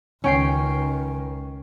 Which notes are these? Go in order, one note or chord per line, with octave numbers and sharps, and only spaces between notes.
C#2 D#3 C#4 G5 C7